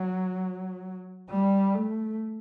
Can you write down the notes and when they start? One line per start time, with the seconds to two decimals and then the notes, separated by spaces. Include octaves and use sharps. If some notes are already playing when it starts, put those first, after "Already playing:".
Already playing: F#3
1.30 G3
1.75 A3